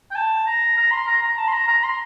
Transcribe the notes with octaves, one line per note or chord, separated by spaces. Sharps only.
G5
A5
A#5
A#5
C6
A#5
A#5
A5
C6
A#5
A#5
C6